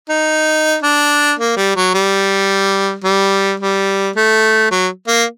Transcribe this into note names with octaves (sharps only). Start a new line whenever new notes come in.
D#4
D4
A#3
G3
F#3
G3
G3
G3
A3
F#3
A#3